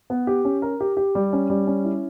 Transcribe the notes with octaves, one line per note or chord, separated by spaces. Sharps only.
B3
G4
C#4
A#4
G4
G4
G3
C#4
G3
C#4
E4